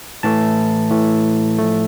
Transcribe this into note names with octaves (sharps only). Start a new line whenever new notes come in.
A2 E3 A3 A5
A2 E3 A3
A2 F3 A3